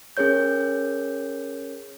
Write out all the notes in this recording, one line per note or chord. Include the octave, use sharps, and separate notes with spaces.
C#4 G#4 A#4 C#5 G6